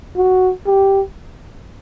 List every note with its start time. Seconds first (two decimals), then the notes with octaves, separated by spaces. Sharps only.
0.16 F#4
0.66 G4